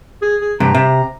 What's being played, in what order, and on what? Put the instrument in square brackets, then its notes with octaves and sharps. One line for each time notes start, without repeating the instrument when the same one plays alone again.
[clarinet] G#4
G#4
[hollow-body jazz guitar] G2 C3 [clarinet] A#5
[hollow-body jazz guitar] C3